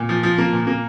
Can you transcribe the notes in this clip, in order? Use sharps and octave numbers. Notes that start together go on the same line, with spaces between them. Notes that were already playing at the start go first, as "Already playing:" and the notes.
Already playing: A#2
F3
F3
A#3
A#2
A#3